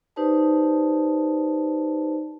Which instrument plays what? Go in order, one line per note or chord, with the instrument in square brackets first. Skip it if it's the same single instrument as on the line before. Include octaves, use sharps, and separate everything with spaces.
[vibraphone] D#4 G4 B4 C5 D5 A5